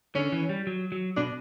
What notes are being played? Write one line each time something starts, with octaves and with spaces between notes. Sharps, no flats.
D3 C#4
E3
G3
F#3
F#3
B2 D4